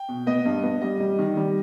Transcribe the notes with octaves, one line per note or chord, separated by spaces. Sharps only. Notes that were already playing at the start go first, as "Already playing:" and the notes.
Already playing: G5
B2
B3 D#5
G2
B3
G3 D#5
G3
D#3
G3